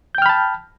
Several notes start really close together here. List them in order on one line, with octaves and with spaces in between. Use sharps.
G6 G5 F6 B5 A5